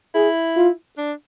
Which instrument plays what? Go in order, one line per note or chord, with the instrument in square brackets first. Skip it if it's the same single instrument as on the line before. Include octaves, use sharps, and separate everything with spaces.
[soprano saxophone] E4 [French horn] G#4
[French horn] F4
[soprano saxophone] D4